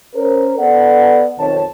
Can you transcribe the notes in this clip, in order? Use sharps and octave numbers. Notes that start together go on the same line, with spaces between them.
C#4 A#4 C5
B3 A4 D5 F#5
B1 F2 D#3 C4 C#5 A5